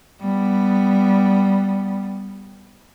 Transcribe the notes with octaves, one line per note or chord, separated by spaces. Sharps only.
G3 B3